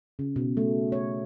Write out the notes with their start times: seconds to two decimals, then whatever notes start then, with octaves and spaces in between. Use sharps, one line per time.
0.19 C#3
0.36 B2
0.57 A3
0.92 C#5